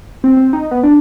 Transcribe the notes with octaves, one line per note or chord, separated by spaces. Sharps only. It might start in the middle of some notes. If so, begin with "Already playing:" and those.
C4
C4
D#4
B3
D4